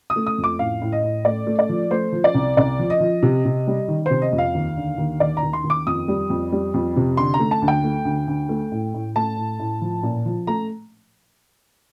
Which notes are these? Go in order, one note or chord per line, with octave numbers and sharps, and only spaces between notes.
D#6
A3
D#6
F2
D6
A2 F5
A2
D#5
A2
A3 D5
A3
D5
F3
A3 C5
F3
D5
C2
C2 D5
F3
D#5
F3
C3
C3
G3
D#3
C3 C5
D#5
F2
F5
D#2
D3
D#2
D#2 D5
A#5
D#2
C6
D#2
D6
F2 D#6
G3
F2
G3
F2
C3
D3 C6
A#5
A3
A5
D2
G5
A3
D2
D2
A3
A2
A2
A3 A5
A2
A2
F3
A#2
F3
A3 A#5